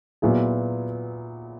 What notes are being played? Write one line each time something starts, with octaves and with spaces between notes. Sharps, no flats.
A#2 F#3 B3 E4 G#4